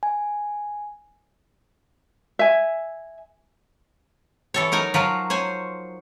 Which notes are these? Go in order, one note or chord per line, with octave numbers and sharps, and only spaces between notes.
G#5
E5 G#5
E3 A4 C#5
F#3 D#4 A#4 G#5
F3 F#3 F4 A#4
C5 C#5 G#5